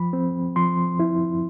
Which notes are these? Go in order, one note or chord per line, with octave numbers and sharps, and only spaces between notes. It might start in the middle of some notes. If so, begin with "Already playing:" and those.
Already playing: F3 B5
C4
F3 C6
E4